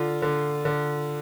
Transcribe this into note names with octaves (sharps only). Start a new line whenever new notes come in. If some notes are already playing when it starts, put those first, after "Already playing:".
Already playing: D3 F4
D3
D3